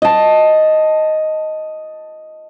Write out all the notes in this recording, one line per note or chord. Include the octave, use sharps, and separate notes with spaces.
D#5 A5